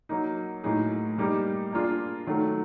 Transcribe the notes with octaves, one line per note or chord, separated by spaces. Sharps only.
F#3 A#3 D#4
A2 F#3 A#3 D#4 G#4
G3 A#3 D#4 G4
A#3 D4 F4 G#4
D#3 F#3 A3